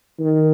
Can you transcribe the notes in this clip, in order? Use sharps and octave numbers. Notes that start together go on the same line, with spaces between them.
D#3